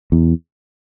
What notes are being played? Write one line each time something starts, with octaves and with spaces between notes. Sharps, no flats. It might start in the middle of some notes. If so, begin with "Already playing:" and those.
E2